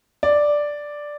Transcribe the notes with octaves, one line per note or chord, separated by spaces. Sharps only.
D5